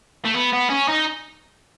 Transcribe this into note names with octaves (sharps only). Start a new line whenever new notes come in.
A3
B3
B3
C#4
D#4